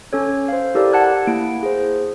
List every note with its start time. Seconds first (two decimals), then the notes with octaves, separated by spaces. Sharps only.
0.13 C#4 A4 C#5
0.48 C5 F5
0.75 E4 G4 A4 A#4 D5
0.93 F#5 A5 F#6 G#6
1.27 A#3 E4 D7
1.63 G#4 C5